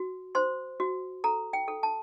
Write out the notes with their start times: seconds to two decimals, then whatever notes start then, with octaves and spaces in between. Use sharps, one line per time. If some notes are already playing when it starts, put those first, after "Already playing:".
Already playing: F#4
0.35 C5 C6
0.80 F#4
1.24 A4 A#5
1.53 G5
1.68 A4
1.83 A5